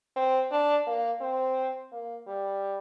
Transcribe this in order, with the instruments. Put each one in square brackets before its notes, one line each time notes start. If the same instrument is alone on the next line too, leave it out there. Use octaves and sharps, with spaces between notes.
[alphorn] C4
D4
A#3
C4
A#3
G3